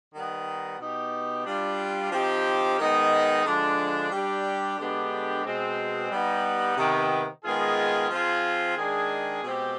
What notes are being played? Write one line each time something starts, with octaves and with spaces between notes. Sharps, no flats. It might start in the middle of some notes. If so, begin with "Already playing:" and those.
D#3 G3 B3 D#4
B2 B3 D#4 G4
G3 D4 F4
F3 C4 D#4 G4
D#3 G#3 B3 D#4
D3 F3 G#3 D4
G3 D4 G4
D3 G#3 B3 D4 G4
B2 G#3 C4
G3 B3 D#4
C3 D#3 B3
D#3 G#3 B3 F4 G#4
F3 C4 F4 G#4
D#3 G#3 D4 G#4
B2 G#3 C4 G4